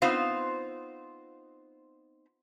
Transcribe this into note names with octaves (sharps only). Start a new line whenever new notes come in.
B3 C4 D#4 F4 C5 F5